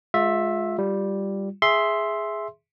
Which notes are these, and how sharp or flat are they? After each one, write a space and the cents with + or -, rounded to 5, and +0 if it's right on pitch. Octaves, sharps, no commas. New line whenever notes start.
G#3 +10 F4 +30 E5 +0
G3 +0 F4 +0
G#4 +0 E5 +0 C6 +5